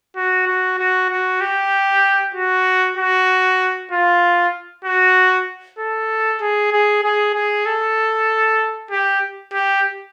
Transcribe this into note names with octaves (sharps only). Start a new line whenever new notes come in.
F#4
F#4
F#4
F#4
G4
F#4
F#4
F4
F#4
A4
G#4
G#4
G#4
G#4
A4
G4
G4